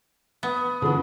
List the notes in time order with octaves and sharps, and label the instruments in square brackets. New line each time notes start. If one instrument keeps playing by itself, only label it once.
[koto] B3 [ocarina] D#6
[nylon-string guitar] D3 E3 [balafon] C#4 F4 G#4